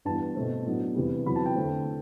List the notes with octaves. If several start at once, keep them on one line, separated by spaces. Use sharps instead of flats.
G2 E3 G3 B3 A5
B2 A3 C4
A2 F#3 B3 D4
E2 C3 G3
E2 C3 F#3 B5
A5
G5
D3 A3 C4